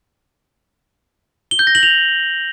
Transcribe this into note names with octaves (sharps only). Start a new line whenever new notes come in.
G7
G6
A#6
F#7
F7